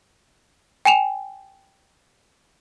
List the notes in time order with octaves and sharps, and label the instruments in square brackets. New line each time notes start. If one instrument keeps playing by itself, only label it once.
[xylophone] G5 G#5 E7 F7